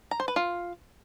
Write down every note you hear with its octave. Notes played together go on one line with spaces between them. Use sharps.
A#5
C5
B4
F4